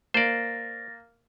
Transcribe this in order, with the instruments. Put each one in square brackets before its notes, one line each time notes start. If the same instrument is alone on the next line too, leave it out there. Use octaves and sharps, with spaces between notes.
[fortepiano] A#3 [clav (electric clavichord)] C5 D5 [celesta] A6 A#6